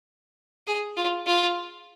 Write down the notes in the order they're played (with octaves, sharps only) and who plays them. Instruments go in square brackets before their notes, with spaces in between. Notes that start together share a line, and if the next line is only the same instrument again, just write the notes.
[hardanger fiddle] G#4
F4
F4